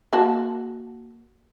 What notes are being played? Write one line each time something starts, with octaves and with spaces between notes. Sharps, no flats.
A#3 F#4 A5